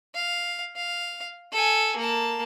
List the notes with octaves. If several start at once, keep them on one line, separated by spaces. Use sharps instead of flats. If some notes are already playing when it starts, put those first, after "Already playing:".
F5
F5
A4 G#5
A#3 A5